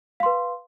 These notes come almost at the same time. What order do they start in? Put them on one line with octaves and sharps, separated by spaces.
F5 C6 B4